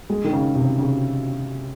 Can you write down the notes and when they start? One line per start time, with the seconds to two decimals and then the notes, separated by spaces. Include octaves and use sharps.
0.10 G#3
0.24 D#3
0.33 C#3
0.55 C3
0.79 C#3